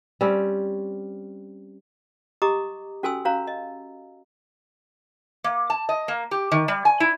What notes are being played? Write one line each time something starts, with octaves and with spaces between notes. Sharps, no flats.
G3 C4 C#4
G4 D#5 A#5 D6 D#6
C#4 F#4 A4 G#5 C6 E6
C#4 F#4 C#5 F5 A#5
D#5
A#3
A5
D#5
A#3
G4
D#3
G3
G#5
E4